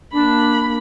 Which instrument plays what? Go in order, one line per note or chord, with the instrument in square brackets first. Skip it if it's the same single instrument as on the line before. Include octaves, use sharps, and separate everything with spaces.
[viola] A#3 B5 [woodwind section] D4